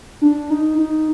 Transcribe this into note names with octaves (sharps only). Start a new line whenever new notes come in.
D4
D#4
D#4